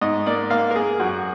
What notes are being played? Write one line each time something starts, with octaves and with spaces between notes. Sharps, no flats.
G#2 D#5
A#3 D5
A#3 F5
A#4
A#3 G#4
F#2 F#4